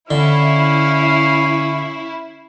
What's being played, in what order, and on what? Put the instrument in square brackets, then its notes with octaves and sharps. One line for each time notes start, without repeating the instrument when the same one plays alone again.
[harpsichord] D3 [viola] C#4 F5 [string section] E4